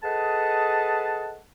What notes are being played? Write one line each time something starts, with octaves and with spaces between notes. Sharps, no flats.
G#4 A4 B4 D#5 F#5 A5